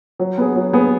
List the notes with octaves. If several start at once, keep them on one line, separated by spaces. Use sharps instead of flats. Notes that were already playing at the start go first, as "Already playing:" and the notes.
F#3
B3 G#4
F#3
B3 G#4